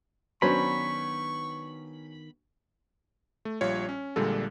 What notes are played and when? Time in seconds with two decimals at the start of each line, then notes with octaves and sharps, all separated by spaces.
0.42 D#3 F#3 B3 C#4 D4 C5 B5 C#6
3.45 A3
3.61 A#1 G3 F4 C#5
3.89 C#4
4.16 A#1 A#2 D3 G3 G#3 A4